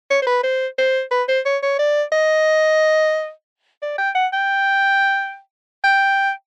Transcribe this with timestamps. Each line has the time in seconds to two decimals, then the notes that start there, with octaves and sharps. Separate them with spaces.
0.10 C#5
0.22 C5
0.27 B4
0.44 C5
0.78 C5
1.11 B4
1.28 C5
1.45 C#5
1.63 C#5
1.79 D5
2.12 D#5
3.82 D5
3.98 G5
4.15 F#5
4.33 G5
5.84 G5